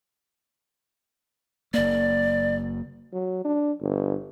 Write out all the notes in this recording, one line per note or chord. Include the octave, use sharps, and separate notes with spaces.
F#1 A#3 D5
F#3
D4
G1